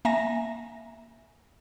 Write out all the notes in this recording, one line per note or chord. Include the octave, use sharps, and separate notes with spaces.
A#3 E5 G#5 A#5 A#6